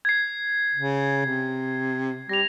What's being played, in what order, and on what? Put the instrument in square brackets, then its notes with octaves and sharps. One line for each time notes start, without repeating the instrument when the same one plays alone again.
[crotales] G#6 C7
[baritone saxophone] C#3
C3
[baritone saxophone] G3 [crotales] A#6 F7